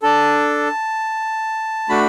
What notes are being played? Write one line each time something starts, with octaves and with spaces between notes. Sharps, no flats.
D4 A4 A5
A3 D4 F#4 B5